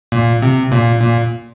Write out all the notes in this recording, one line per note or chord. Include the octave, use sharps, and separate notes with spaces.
A#2
C3
A#2
A#2